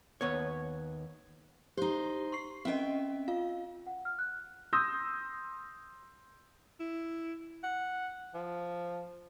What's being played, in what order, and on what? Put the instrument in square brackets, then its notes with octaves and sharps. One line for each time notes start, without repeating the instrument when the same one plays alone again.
[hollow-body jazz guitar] D#2 B3 C#5
[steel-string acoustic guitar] D#4 C5 [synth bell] G4
[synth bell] C6 C#6 C7
[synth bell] C4 C#4 D#5 [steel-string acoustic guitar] E5 G5
[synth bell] F4 F5
[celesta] F#5
F6
F#6
[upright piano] C6 D#6 E6 G6 A#6
[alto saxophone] E4
F#5
F3